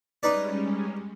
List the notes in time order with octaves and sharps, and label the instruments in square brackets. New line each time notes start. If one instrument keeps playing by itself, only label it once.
[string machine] G3 G#3 C#4 [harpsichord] D#4 B4 D5